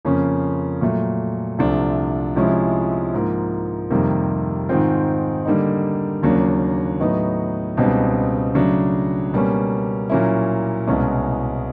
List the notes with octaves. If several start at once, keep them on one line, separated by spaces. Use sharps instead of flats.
F2 C#3 F3 A#3 C#4
A#2 F#3 A3
C2 C3 F3 A3 D4
C3 F3 G#3 C#4 E4
G#2 F3 A#3
F2 C3 D#3 G3 A#3
G#2 D#3 G#3 C4 F4
D3 G3 A#3 D#4
D#2 C#3 F#3 A#3 D4
A2 F#3 B3 D#4
C#2 B2 G3 C4 D#4
C#3 F#3 A3 D4
B2 G3 A#3 C#4
A#2 F#3 A#3 C#4 E4
C2 B2 G#3 C#4